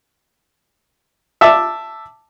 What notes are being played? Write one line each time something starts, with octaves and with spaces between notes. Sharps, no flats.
E5 A5 D6 E6